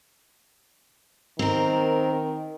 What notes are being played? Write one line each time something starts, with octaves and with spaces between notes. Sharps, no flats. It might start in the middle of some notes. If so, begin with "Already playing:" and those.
D#3 C4 A#4